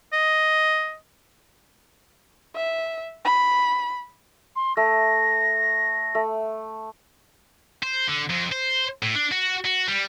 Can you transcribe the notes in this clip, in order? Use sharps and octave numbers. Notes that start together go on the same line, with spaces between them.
D#5
E5
B5
C6
A3 A#6
A3
C5
D3
F2
C5
A2
D4
F#4
F#4
G3